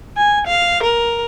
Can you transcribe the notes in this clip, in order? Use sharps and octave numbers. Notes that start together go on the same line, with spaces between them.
G#5
F5
A#4